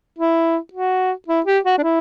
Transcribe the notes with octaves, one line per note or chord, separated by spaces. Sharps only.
E4
F#4
E4
G4
F#4
D4
E4